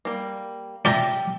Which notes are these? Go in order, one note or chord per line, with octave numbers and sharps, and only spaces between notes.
G3 A#3
D4 F4 G4 E5 A#5